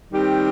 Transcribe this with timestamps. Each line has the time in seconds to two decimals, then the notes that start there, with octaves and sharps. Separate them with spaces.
0.12 D#3 G3 C4 G4